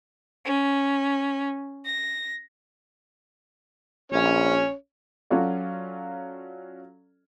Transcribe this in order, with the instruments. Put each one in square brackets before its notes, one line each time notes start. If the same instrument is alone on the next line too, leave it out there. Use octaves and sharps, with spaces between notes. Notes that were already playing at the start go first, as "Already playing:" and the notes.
[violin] C#4
A#6
[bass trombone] A#1 [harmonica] C#4 C#5
[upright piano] F#3 C#4 F4 F#4 A4 D5